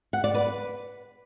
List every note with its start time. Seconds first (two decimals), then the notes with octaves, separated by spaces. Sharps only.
0.13 F#5
0.24 D5
0.34 B4